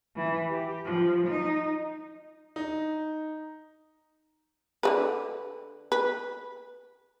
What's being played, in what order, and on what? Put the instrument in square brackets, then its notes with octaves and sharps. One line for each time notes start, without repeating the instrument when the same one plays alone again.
[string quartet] E3
G4
F3
D#4
[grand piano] D#4
[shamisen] D3 A3 B4
B4